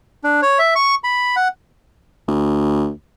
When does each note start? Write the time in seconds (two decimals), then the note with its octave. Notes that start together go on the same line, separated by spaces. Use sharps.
0.24 D4
0.42 C#5
0.59 E5
0.76 C#6
1.04 B5
1.36 F#5
2.28 D2